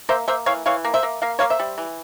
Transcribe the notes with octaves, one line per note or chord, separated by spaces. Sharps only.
A#3 C5 E5
A#3 C5 E5
E3 C#5 F5
E3 C#5 F5
A#3
C5 E5
A#3
A#3 F5
A#3 C#5 F5
C5 E5
G3
E3